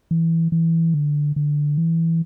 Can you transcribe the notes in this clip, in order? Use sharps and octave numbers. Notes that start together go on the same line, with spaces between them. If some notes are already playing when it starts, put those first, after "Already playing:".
E3
E3
D3
D3
E3